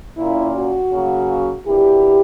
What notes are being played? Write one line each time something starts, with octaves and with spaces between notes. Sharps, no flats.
A#2 A#3 C#4 E4
F#4
C#3 F#3 A#3 C#4
B2 A#3 D4 E4 G4